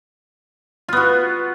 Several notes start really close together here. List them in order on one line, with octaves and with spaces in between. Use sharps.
F4 B3 F#4